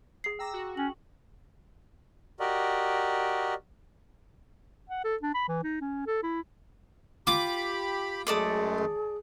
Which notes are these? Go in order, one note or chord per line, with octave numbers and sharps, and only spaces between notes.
G#4 C7
G5 A#5 D6 E6 A#6
F#4
C#4 G5 F#7
F#4 G4 A#4 D5 D#5
F#5
A4
D4
B5
E3
D#4
C#4
A4
E4
F4 G4 B5 D6
F#2 G#3 A3 G#4 A4 D5 D#6